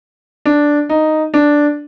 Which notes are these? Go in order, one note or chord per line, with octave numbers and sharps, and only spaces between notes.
D4
D#4
D4